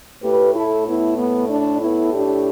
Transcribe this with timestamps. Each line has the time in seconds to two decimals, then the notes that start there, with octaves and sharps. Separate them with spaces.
0.23 A2 A3 G4 B4
0.55 E4 A4
0.86 B3 E4
1.18 B3
1.49 D4
1.81 B3 E4
2.13 D4 G4